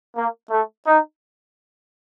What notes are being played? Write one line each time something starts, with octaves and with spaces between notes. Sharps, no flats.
A#3
A3
D#4